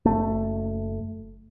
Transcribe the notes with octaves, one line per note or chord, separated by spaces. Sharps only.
F#1 A3